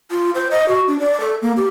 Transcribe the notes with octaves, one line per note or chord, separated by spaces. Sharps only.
F4
C5
D#5
F#4
D4
D5
A4
A#3
G4